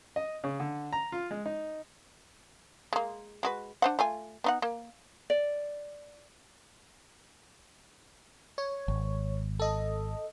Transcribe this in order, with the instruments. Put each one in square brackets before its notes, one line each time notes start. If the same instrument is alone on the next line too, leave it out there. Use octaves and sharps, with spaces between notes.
[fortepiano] D#5
C#3
D3
A#5
F4
G#3
D#4
[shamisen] G#3 A#3
G#3 F#4 B4
D4 C5 F#5
A3 F4 G#5
B3 D#4 F#5
A#3
[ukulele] D5
[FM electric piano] C#5
[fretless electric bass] G#1
[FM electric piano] A4 D#5